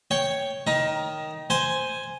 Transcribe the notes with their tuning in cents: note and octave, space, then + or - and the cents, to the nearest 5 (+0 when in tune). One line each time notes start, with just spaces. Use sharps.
C#5 +0 G5 +0
D#3 +0 A#5 +25
C5 +0 G#5 +0